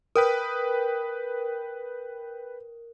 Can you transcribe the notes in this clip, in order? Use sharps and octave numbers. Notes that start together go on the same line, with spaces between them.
A#4 B4 G5 D#6